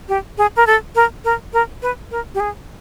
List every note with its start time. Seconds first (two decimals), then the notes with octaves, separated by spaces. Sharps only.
0.09 G4
0.38 G#4
0.56 A#4
0.67 A4
0.95 A#4
1.24 A#4
1.53 A#4
1.82 B4
2.11 A#4
2.35 G4
2.40 G#4